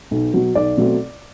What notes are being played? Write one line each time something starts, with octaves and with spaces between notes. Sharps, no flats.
B1
B2 F#3
B1 D5
B2 F#3 A3 C4